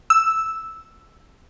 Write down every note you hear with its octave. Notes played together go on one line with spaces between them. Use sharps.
E6